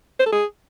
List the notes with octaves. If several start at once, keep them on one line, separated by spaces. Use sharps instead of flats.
C5
A4
G#4